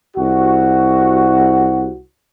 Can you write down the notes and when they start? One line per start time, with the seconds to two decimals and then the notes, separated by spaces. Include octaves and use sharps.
0.17 C2 F#4